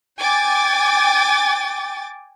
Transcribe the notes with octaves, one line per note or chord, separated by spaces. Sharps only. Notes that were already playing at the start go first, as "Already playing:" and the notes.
G5 G#5 D6 A6